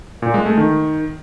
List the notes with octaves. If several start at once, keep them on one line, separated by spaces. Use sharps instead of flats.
A#2
G#3
A3
D#3